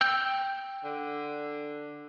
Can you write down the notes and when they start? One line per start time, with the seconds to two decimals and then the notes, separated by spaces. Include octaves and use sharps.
0.01 G5 E6 G6
0.84 D3